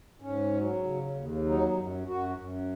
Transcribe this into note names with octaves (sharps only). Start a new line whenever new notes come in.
G#2 C#4
F#3
C#3
D#2
F#3 D#4
F#2
F#2 F#4
F#2